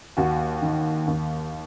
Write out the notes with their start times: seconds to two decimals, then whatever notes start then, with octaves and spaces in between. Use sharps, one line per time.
0.17 D#2 F#4
0.62 D#3
1.07 D#2